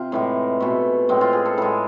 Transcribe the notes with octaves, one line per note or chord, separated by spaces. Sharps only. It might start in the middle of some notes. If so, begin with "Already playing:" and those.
Already playing: C3 F4
A2 E3 G#3
B2 A3
A2 G#3 C4
F4
G#4
A4
A2 G#3 B4